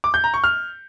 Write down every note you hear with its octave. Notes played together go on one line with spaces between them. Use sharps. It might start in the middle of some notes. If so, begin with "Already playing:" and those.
D6
G6
A#5
C#6
F6